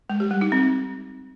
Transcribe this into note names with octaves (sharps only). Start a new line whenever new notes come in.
G#3
G4
G3
D#4
C4